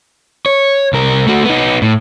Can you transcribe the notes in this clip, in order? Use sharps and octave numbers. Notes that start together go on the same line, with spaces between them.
C#5
C2 A#4
A3 F#4
B3 D#4
A2